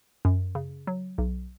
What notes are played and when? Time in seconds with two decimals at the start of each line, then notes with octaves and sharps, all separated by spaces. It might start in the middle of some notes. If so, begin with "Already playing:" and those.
0.25 F#2
0.55 C#3
0.87 F#3
1.18 B1